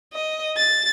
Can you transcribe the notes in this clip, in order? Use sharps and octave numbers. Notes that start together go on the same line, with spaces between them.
D#5
A6